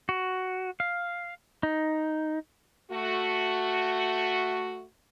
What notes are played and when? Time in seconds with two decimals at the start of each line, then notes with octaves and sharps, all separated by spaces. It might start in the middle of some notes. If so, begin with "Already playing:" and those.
0.09 F#4
0.80 F5
1.63 D#4
2.92 A3 F#4